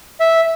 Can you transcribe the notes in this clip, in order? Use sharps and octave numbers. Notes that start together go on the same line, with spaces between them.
E5